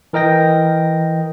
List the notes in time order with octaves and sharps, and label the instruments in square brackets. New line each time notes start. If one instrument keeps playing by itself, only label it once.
[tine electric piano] E3 A#4 D#5 G5 A#6